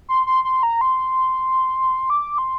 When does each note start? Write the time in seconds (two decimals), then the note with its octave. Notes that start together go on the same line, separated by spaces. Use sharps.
0.09 C6
0.27 C6
0.45 C6
0.63 A#5
0.81 C6
2.10 D6
2.38 C6